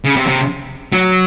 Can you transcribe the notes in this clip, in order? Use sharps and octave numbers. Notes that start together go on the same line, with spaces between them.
C#3
C3
C3
F#3